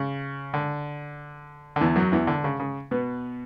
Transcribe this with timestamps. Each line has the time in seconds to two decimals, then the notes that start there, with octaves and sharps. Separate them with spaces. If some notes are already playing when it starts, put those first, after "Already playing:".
Already playing: C#3
0.54 D3
1.76 D3
1.81 E2 E3
1.96 F#2 F#3
2.12 E2 E3
2.27 D3
2.44 C#3
2.60 C#3
2.91 B2 B3